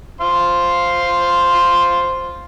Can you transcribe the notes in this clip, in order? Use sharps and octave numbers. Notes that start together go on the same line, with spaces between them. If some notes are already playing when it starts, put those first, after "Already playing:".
C5 F5 C6